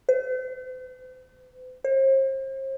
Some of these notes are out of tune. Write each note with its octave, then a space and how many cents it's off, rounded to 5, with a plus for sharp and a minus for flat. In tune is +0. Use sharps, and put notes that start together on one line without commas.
C5 -45
C5 +40